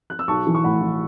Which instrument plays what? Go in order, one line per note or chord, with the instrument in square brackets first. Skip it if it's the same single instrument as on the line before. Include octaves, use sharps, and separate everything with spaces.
[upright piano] F#6
E6
B1 A5 C#6
E3
C#6
A2 F#5 B5
E3